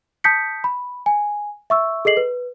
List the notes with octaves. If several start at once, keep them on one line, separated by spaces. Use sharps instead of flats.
A5 D#6 G6 B6 C#7
B5
G#5
E5 C#6 E6
G#4 A4 D#5 C7 F#7
B4